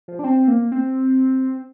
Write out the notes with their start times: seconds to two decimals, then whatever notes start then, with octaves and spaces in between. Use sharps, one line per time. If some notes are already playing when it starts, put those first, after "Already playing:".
0.08 F3
0.19 D4
0.24 C4
0.48 A#3
0.72 C4